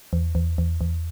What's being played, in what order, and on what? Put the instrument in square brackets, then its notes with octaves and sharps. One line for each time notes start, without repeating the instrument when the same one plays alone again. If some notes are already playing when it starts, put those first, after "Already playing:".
[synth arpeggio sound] E2
E2
E2
E2